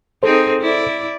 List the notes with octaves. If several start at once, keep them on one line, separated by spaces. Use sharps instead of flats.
C4 D#4 G#4 A4 C5
E4 D5